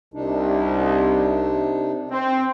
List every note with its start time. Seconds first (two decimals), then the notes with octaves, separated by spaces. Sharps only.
0.14 C2 C3 D4 D#4
2.11 C4